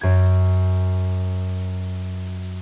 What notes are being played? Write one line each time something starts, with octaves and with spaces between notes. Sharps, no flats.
F#2 G#6